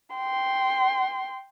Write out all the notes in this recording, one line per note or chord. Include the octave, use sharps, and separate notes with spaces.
G5 C6